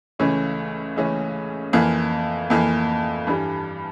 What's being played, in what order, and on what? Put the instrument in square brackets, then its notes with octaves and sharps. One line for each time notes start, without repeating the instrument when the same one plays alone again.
[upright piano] C#2 C#3 E3 A3 C#4
C#2 C#3 E3 A3 C#4
F2 E3 A#3
F2 E3 A#3
G2 E3 G3